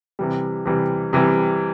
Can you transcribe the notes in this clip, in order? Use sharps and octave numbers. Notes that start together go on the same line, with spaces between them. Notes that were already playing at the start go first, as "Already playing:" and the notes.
C3 E3 G3
C3 E3 G3
C3 E3 G3